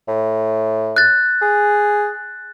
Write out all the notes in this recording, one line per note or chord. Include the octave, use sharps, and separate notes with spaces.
A2
F#6 A6
G#4